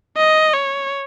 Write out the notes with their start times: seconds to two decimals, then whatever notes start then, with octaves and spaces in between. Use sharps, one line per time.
0.17 D#5
0.54 C#5